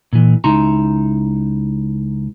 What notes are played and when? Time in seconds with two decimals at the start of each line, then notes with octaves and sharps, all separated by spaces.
0.13 A#2 E3
0.44 C#2 D#4 E4 A#5 C6